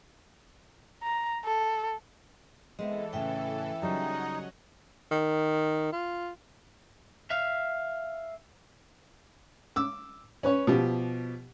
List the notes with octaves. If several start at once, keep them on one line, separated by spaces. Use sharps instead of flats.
A#5
A4
E3 G#3 B3 C4 A4 D#5 E5
A2 C#3 E5 G5
C#3 F#3 G3 D#4 C#5 D#5 F#5
D#3
F4
E5 F5
D6 E6
C#4 B4 C#5
B2 F3 G4